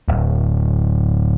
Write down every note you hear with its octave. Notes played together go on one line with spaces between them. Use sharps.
D1